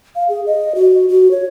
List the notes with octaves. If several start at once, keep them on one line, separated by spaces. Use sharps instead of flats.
F5
G#4
D#5
F#4
F#4
C#5